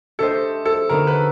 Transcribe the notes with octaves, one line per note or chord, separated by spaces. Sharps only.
A3 D4 G4 A4 C5 D#5
A4
D3 F#3 B3 D#4 A#4
B4